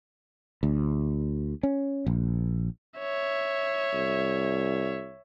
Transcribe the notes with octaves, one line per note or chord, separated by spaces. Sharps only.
D2
C#4
A#1
C#5 E5
C2